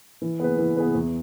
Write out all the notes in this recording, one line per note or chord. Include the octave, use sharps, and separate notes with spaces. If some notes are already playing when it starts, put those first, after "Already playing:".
E3
B3 G#4 B4
E3
B3 G#4 B4
E2